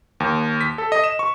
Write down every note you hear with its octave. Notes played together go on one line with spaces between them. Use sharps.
D#2
B6
A4
D#5
E7
C#6